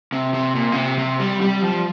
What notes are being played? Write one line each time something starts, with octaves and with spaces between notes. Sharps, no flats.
C3
C3
A#2
C#3
C3
C3
G3
G3
F3